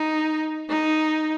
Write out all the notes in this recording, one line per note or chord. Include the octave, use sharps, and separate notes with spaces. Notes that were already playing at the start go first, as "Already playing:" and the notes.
Already playing: D#4
D#4